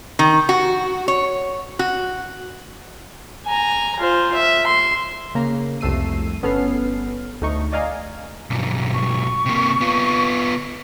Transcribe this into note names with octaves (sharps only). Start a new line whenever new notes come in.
D#3
F#4
C#5
F#4
G#5 A#5
F4 C5
E5
C6
C#3 A#3 A#5
C2 F2 A3 E6 C7 D#7
G1 B3 C#4 A4 F6 C7
D2 A3 D#4 C#6
D5 D#5 F5 G#5 A#5
B1 G2
C#6
C3 A#3
B3 F4